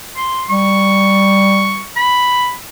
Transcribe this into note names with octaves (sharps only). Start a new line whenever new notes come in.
C6
G3 C#6
B5